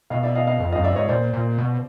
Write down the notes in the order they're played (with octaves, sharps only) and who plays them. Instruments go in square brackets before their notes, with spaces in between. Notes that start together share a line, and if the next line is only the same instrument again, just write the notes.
[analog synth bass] B2 [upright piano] D#5 F5
[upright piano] D5 E5
D#5 F5
D#5 F5
[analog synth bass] F2
[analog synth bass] F#2 [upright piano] D#5 F5
[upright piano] D5 E5
[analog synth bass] G#2 [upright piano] C#5 D#5
[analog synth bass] A#2 [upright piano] C5 D5
[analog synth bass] A#2
B2